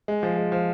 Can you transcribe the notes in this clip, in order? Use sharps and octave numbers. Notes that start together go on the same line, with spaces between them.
G#3
F3
G#3
F3